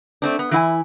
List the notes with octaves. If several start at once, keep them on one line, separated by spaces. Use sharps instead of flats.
A3 C4 D4
B3
E3 E4 F#5 G#5